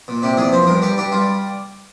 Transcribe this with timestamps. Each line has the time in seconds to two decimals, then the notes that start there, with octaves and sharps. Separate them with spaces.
0.08 A#2
0.22 C3 G4
0.37 E2 G#4
0.52 F3 C5
0.67 G2 A#4
0.82 G3 G4
0.97 G2 G4
1.12 G3 F4